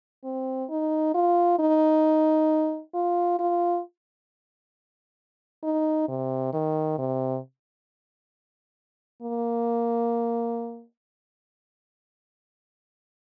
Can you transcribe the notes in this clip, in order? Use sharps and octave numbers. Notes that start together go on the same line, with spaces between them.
C4
D#4
F4
D#4
F4
F4
D#4
C3
D#3
C3
A#3